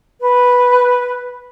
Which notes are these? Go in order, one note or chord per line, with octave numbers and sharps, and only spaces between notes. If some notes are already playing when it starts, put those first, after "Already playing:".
B4